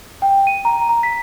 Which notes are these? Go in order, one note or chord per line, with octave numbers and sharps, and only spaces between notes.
G5
D#7
A#5
A#5
B6